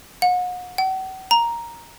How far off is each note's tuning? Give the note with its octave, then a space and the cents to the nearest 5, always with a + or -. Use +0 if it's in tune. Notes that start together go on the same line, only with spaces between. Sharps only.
F#5 -40
F#5 +40
A#5 +5